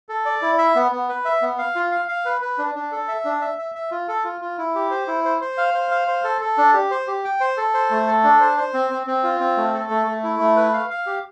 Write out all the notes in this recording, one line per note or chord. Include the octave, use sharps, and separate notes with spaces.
A4
D5
E4
E5
B3
B3
B4
E5
B3
F5
F4
F5
F5
B4
B4
D4
D4
A4
E5
D4
E5
E5
E5
F4
A4
F4
F4
E4
G4
C5
E4
C5
C5
F5
C5
F5
C5
A4
A4
D4
G4
C5
G4
G5
C5
A4
C5
A3
A4
D4
C5
C5
C4
C4
C4
F4
C4
A3
A4
A3
A3
E4
A3
B4
F5
F5
G4